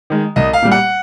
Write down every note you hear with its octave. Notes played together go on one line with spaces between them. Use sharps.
D#3 G#3
C2 D#5
F5
A#2 G3
F#5